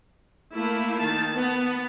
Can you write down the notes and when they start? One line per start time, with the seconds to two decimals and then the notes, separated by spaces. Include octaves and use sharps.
0.54 A3 A#3 E4
1.00 D#3 A5
1.34 B3